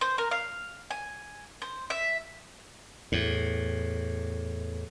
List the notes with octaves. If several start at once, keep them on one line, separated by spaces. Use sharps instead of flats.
C5
A#4
F5
G#5
C5
E5
E2 A2